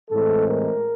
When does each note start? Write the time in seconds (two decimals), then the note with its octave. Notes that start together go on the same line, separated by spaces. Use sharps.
0.10 A2 E3 G#3 C4 A4
0.49 A#4